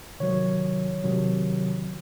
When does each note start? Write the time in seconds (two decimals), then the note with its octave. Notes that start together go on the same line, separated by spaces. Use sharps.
0.20 C3 D#3 F#3 C#5
1.04 C3 D#3 F#3